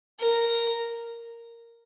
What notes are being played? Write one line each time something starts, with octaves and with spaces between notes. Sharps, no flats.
A#4